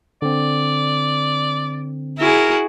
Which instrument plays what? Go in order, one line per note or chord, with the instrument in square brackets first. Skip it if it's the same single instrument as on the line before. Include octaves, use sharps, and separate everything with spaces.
[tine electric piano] D3 C4 [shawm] D5
[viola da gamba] E4 F#4 G#4 [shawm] A#4